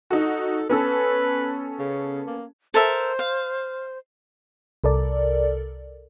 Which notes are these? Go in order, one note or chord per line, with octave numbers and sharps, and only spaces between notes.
D#4 F#4 A4
B3 C#4 A4 B4
C#3
A#3
A4 A#4 C5 E5
F5
C2 A4 A#4 D5